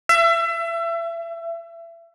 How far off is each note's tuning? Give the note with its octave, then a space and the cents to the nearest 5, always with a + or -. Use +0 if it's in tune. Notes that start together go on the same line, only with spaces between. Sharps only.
E5 +30